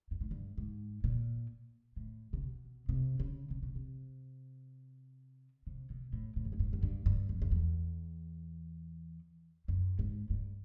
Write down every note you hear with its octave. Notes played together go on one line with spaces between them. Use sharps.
G2
G#2
G2
G#2
A#2
A2
C3
B2
C3
C#3
C3
B2
C3
C3
B2
A2
A2
F#2
G2
G#2
F#2
G2
G2
F2
F2
E2
F#2
G#2
G2